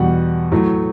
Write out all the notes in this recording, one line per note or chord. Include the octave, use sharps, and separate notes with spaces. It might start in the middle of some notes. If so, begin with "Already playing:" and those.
Already playing: E2 B2 G3 F#5
A2 F#3 A3